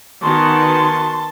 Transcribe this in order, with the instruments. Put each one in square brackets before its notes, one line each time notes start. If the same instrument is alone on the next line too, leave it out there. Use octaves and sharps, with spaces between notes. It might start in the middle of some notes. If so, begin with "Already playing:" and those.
[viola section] D#3 B3 F#4 [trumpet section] G#5 C#6 [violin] A5 [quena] C6